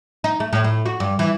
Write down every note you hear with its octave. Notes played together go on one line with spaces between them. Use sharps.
D#4
A3
A2
A2
F#4
G2
E3